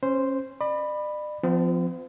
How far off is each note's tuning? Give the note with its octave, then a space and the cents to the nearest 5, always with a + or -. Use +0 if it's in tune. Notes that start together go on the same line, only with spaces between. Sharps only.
C#4 -25 C5 -5
D5 +40 B5 +0
F3 +0 C4 -40